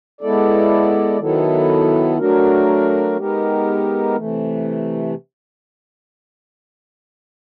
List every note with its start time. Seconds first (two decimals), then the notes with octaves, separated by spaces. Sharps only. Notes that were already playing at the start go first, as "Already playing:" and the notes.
0.21 G#3 B3 E4 A4 D5
1.19 D#3 F#3 B3 E4 A4
2.18 F#3 A3 D4 F#4 A#4
3.16 G#3 B3 D#4 G4 A#4
4.15 C3 E3 A3